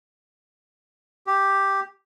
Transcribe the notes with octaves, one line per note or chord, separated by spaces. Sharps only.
G4